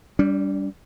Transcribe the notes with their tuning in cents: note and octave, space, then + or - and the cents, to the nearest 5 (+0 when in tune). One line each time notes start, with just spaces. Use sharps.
G3 +0 D4 -40